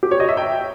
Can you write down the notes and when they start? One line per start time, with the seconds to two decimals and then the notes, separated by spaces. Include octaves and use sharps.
0.03 G4
0.11 C#5
0.20 D#5
0.29 E5
0.37 G5